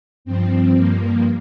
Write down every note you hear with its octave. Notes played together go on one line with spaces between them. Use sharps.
G2 F3 C4
G2 F3 A#3